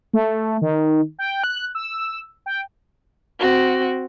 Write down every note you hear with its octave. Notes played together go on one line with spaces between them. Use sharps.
A3
D#3
G5
F#6
E6
G5
C4 F#4